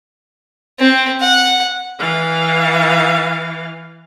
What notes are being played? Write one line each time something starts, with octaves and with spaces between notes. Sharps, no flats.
C4
F#5
E3 F5